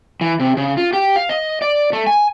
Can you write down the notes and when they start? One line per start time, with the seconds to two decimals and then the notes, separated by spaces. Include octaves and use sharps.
0.21 E3
0.40 C3
0.57 C#3
0.77 F4
0.93 G4
1.16 F5
1.29 D#5
1.62 D5
1.93 A3
2.07 G#5